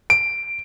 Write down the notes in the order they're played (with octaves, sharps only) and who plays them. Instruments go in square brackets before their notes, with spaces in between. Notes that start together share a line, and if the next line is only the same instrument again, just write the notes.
[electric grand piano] D7